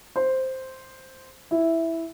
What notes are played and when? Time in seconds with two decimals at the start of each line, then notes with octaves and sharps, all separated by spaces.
0.16 C5
1.51 E4